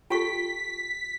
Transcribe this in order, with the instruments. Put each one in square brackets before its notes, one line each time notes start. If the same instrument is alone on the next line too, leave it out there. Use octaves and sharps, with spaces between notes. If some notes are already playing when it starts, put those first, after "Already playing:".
[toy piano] F4 G4 C#6 [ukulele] A4 G5 [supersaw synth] B6